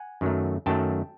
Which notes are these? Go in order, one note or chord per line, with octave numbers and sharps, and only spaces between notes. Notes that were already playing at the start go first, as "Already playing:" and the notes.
Already playing: F#5 G#5
F#2 D#3 F#3 A3
F#2 D#3 F#3 A3 G5 A5